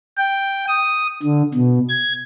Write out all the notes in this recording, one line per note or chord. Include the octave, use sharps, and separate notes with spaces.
G5
D#6
D3
B2
G#6